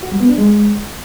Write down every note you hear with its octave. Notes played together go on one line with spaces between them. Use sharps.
F#4
G3
B3
D4
G#3